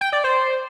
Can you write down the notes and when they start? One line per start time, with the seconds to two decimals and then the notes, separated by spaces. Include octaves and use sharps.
0.01 G5
0.13 D5
0.24 C5